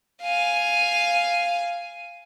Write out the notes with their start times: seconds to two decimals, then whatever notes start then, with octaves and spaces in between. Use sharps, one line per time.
0.22 F5 G#5